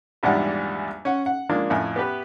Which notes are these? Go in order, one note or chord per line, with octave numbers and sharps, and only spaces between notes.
A#1 E2 G#2 G3 D4 F#5
C#4 F#5
F#5
F3 G#3 A#3 D4
F2 A2 G#5
B3 G4 B4